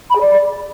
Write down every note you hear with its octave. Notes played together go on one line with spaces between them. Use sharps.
B5
G#4
D5